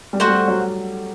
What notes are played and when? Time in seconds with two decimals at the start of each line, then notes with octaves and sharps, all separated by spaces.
0.13 G3
0.19 A3 F#4 C5 F#5
0.27 G3
0.34 A3
0.48 F#3